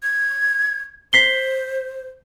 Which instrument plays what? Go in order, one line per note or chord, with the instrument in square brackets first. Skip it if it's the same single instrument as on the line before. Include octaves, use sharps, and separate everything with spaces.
[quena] G#6
[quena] C5 [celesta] B6 C7 G7